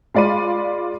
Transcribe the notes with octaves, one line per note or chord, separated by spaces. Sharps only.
G#3 F4 D5 B5 D#7